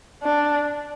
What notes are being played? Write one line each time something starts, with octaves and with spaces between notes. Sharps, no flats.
D4